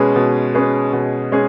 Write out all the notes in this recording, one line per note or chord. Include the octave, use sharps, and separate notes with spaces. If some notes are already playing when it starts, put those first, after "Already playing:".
Already playing: B2 G#3 C#4 G#4 B4
B2
G#3 C#4 G#4 B4
B2
G#3 C#4 G#4